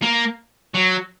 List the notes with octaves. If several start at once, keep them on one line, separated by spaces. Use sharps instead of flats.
A#3
F#3